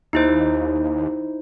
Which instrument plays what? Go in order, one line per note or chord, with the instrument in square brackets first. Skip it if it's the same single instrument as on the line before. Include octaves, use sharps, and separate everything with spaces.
[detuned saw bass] D#2 [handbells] D#4 E4 C5